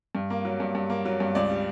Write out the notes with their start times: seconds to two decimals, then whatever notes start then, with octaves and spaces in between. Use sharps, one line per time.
0.15 G2
0.30 A#3
0.45 F#3
0.60 G2
0.75 G2
0.90 A#3
1.05 F#3
1.20 G2
1.35 C#2 D5
1.50 G3